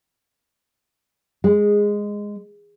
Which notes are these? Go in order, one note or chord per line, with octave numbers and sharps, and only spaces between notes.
G#3